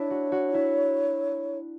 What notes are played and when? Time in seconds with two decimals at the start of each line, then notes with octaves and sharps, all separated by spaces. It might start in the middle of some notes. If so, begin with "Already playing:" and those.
Already playing: D4 E4 C#5
0.10 F#4
0.32 F#4
0.54 E4